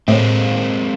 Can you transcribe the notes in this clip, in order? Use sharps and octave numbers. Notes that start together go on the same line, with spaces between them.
A2 G#3 A#3 C4